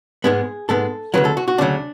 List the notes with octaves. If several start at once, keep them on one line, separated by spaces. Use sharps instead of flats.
G#2 G#3 B3 G#4
G#2 G#3 B3 A4
D2 C#3 F#3 B4
A4
F#4
F#4
D2 C#3 F#3 D4